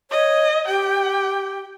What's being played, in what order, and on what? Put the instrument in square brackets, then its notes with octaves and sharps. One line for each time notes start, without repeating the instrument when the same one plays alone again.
[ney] C#5 [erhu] D#5
[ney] G4 [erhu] G5